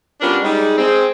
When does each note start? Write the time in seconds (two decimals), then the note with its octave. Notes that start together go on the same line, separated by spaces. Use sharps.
0.21 G3 B3 C#4 D4 F4 A#4
0.43 G3 G#3 D#4
0.78 G#3 C4